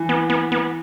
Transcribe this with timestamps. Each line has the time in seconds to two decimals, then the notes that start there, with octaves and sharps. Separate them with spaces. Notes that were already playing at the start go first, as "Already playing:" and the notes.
Already playing: E3
0.09 B3
0.30 B3
0.52 B3